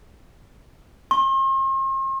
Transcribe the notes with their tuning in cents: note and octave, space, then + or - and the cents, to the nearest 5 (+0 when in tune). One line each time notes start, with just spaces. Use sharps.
C6 +45